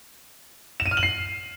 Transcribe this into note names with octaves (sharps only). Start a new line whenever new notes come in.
E7
D#7
F6
F#7
C7